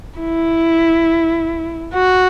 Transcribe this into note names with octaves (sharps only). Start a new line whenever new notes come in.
E4
F#4